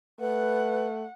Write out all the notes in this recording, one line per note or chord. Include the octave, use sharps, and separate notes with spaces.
A3 B4 F#5